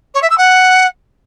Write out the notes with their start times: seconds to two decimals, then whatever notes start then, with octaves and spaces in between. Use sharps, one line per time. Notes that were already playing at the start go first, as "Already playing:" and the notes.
0.14 C#5
0.22 E5
0.30 E6
0.38 F#5